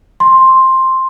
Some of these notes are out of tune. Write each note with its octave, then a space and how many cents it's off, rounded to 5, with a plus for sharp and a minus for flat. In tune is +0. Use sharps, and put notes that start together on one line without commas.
C6 +5